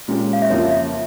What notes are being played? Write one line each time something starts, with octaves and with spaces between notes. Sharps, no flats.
A#2 G#3 C#4 G4
F5
E5
F2 C#3 F3 A#3 F4 C#5
E5